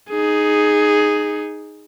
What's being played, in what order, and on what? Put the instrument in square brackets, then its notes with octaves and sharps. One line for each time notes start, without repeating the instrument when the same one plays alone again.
[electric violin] D#4 G#4